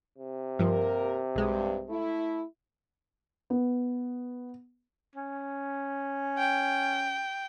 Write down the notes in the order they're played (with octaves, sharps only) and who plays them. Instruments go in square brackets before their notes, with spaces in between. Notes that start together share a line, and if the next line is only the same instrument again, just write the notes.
[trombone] C3
[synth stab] G2 F3 [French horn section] A#3 G4 A#4
[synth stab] B1 G#3 [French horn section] G2
[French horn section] A3 E4
[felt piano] B3
[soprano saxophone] C#4
[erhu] G5